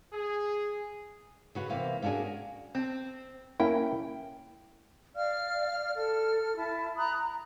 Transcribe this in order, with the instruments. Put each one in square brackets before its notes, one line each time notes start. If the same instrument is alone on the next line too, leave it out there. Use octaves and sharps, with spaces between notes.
[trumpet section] G#4
[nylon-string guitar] C#3 F#4 B4
C3 E3 A#3
A#3 C#4 D4 F#4 G#4
[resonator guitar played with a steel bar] C4
[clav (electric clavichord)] A#3 C#4 E4 [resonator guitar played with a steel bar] G5
[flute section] D5 F5 F6
A4 F6
E4 A5
A#5 B5 D#6 F#6
A#5